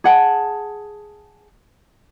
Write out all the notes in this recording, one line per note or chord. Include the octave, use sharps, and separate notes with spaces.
G#4 F#5 A5